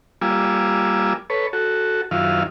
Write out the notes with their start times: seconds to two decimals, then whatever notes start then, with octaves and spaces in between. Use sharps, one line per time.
0.21 G3 A#3 F4 G#5 D6 E6
1.30 A4 B4 C#5
1.53 F#4 A4
2.11 F#2 D#3 E4 F4 F5